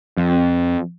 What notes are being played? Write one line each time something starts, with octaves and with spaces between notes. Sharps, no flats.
F2